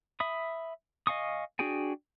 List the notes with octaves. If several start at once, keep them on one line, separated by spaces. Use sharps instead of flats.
E5 B5 D#6
D#5 F5 G#5 C#6 D#6
D4 F#4 G#4 G5 G#5